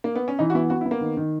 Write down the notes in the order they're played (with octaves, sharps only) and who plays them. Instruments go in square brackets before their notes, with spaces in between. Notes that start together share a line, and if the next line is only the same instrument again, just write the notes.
[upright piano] A#3
B3
C#4
[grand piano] E3 [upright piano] D#4
[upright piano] F#4
[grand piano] B3 [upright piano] E4
[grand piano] B3 [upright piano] F#4
[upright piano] E4
[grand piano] B3
[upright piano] A#3
[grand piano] D#3
D#3